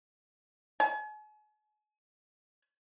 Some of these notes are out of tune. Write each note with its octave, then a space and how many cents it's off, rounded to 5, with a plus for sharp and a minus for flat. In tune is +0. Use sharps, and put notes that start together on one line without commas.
G#5 +40